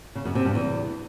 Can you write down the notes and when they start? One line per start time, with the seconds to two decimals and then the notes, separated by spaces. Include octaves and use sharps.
0.15 C#3
0.25 F#2
0.35 C3
0.45 G2
0.55 E2